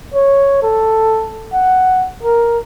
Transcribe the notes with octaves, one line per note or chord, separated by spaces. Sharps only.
C#5
A4
F#5
A#4